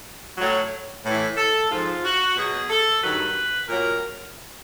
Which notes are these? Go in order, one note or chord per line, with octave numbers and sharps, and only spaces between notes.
A2 F#3
A2 E3
A4
G#2 F3 F4
F#4
B2 F#3 G#4
A4
G2 D#3 F#3 B4
A#2 F#3 A#4